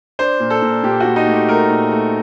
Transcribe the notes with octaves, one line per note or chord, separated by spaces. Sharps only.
D4 C5
A#2
A4
A#2
A#2 G4
F#4
A#2
D#4
A3
G4
A3 A#4
A#2
A3